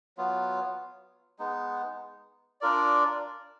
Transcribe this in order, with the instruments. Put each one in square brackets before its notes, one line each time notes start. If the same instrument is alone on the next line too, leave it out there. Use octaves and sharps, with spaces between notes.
[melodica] F#3 B3 F4
G#3 B3 D#4
D4 F4 A#4 D5